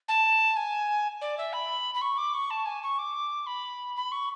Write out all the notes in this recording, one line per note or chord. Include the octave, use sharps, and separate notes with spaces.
A5
G#5
D5
E5
B5
B5
C#6
D6
C#6
A5
G#5
C#6
D6
B5
B5
C#6